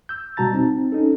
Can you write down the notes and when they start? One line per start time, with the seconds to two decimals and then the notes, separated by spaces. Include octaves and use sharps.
0.09 E6 G6
0.37 B2 G3 F#4 A5 A#5 A6
0.53 C4 D#4
0.92 C#4 D#4 A4